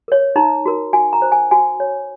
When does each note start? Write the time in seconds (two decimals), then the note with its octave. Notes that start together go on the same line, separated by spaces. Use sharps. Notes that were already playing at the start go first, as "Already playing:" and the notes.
0.08 A#4 C#5
0.36 D#4 A#5
0.66 F#4 A#4
0.93 F#4 G#5
1.13 A#5
1.22 C5
1.32 G#5
1.51 F#4 G#5
1.80 C#5